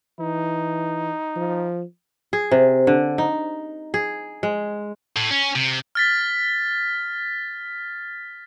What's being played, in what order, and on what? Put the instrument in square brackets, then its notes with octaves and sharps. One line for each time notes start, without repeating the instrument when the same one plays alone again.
[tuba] E3 [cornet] D#4
[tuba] F3
[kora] G#4
C3
D3
D#4
G#4
G#3
[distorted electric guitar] A2
C#4
C3
[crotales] F6 A6 B6